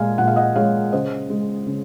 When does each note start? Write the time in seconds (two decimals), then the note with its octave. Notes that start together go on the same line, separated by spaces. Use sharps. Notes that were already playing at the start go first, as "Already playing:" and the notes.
Already playing: A#2 G#3 F5 G#5
0.18 A#2 F#5
0.28 F5
0.36 D#5 F#5
0.56 G#3 C#5 F5
0.92 C#3 C5 D#5
1.30 G#3
1.67 C#3